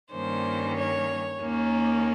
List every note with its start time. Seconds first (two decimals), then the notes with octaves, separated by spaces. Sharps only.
0.12 G2 D#3 G3 A#3 C#4 C5
0.76 C#5
1.41 D#2 D#3 A#3 C#4